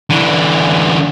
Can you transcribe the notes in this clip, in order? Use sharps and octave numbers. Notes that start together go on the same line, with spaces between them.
D3 E3